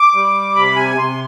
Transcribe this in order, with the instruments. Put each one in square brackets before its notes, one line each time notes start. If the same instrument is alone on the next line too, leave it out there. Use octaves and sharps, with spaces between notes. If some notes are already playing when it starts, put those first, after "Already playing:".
Already playing: [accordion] D6
G3
C3 B5
G#5
C3 C6